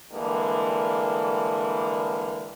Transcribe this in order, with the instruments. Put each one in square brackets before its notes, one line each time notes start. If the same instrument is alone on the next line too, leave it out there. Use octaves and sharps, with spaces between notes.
[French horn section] D3 E3 G3 G#3 A#3